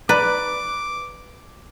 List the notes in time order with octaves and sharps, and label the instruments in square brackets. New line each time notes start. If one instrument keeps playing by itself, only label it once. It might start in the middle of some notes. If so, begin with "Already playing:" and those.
[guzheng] B4 [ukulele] D5 A#5 [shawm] D6